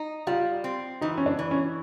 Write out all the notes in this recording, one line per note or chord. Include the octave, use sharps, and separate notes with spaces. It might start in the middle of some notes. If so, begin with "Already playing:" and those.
Already playing: D#4
G3 F4
C4
E3 D#4
C#4
D4
E3
C#4